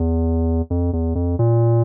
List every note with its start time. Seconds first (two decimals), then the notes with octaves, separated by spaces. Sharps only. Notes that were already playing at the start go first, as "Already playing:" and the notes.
Already playing: E2
0.70 F2
0.93 E2
1.15 F2
1.39 A#2